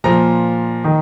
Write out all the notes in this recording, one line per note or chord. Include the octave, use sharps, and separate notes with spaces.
A#2 F3 A#5
D#3